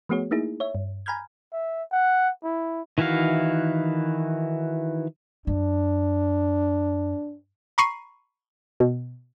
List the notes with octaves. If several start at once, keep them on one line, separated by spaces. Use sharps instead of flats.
F3 A3 B3 F#4 G#4 C#5
A3 A#3 D#4 E4 G#4
C#5 E5
G2
G#5 A#5 B5 F6 G6 G#6
E5
F#5
E4
D#3 E3 E4 F#4 F5
F#2 D4
A#5 B5 C#6 C7 D#7
B2